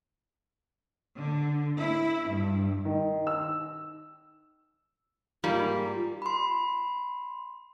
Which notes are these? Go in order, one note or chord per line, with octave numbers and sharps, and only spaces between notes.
D3
E4
G2
D#3
E6
G#2 G3 A#3 F4
B5 C6